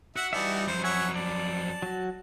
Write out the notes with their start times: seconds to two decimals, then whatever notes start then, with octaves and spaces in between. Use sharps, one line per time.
0.16 F#4 E5 F#5
0.33 E3 G3 D4 D#4 E5
0.67 F2 F#3 C5
0.84 C#5 E5 F#5 G#5
1.16 D5 A5
1.82 F#3 F#4